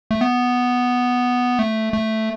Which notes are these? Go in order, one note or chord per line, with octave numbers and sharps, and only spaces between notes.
A3
B3
A3
A3